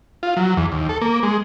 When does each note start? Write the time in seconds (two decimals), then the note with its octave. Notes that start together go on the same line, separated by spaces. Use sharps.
0.23 F4
0.37 F#3
0.57 E2
0.72 D#2
0.89 A4
1.02 A#3
1.23 G#3